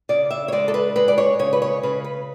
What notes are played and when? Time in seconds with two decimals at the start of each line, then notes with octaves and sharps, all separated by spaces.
0.09 C#3 D5
0.31 E5
0.48 C#5
0.52 G#3 D5
0.68 A4
0.74 B4
0.96 G#3 B4
1.08 D5
1.18 C#5
1.39 C#3 C#5
1.53 B4
1.62 C#5
1.83 C#3 B4
2.04 B4